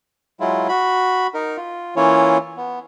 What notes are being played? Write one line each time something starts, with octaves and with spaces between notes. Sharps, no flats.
F#3 G#3 E4 F4
F#4 B5
D#4 A#4
F4
E3 A#3 C#4 E4 F4 C#5
B3